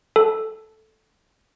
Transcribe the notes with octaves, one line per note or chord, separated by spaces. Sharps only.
A4